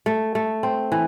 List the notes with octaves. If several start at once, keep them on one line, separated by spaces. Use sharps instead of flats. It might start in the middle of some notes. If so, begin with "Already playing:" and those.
A3
A3
C4
E3